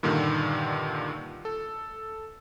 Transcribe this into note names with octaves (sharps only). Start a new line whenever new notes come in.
G2 A#2 D3 D#3
A4